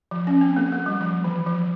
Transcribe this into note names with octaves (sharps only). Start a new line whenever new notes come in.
F3
C#4
C4
A#3
A#3
G3
F3
E3
F3